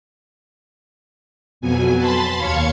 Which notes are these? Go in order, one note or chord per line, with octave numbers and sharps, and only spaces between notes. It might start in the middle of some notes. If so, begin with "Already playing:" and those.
F2 B2 F#3 G#5
A5 B5 C6 A6
D#2 C#5 F5 G#6 C#7